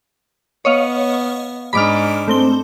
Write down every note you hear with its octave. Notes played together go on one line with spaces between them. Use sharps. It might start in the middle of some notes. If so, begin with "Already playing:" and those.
B3 C#5 D#5 F5
G#2 D4 B5 D6 F6
A3 C4 G7